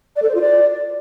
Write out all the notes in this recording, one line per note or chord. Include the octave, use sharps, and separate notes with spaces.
D5
A4
C5
F4
D5